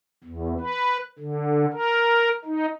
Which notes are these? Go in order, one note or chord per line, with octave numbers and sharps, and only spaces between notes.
E2
B4
D3
A#4
D#4